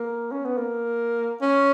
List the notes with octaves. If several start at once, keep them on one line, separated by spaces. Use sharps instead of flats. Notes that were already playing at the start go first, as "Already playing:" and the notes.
Already playing: A#3
C#4
B3
A#3
C#4